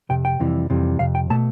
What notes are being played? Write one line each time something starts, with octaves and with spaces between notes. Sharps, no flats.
F2 C3 G5
G5
F2 C3 E3 G3
F2 C3 E3 G3
F2 C3 F5
G5
B2 A3 A5